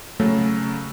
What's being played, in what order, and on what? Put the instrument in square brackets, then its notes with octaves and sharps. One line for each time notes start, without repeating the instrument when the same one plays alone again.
[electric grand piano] C#3 F#3 A4 [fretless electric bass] A3